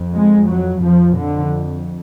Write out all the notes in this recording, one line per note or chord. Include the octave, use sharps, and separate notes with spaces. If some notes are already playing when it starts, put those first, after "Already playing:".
Already playing: F2
G#3
F#3
F2 F3
D3